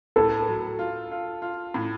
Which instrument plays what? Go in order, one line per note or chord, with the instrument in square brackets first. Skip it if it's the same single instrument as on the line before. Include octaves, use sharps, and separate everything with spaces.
[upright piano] A2 [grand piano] A4
[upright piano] F#3
F4
F4
F4
A2